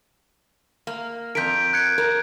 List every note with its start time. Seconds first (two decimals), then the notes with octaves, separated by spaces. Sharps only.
0.87 A#3
1.35 F2 A#4 G6 B6 D7
1.73 F#6 G#6 C#7
1.98 A#4